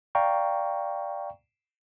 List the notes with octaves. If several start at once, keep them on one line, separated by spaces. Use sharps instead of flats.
D5 F5 G5 A#5 C#6